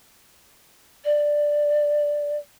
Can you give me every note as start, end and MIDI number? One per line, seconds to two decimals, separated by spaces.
1.04 2.36 74